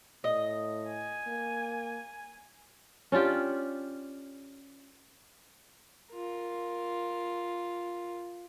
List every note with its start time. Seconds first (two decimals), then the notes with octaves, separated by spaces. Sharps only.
0.24 A2 D#5
0.88 G#5
1.27 A#3
3.12 C#4 D4 F4 G4
6.13 F4 A#4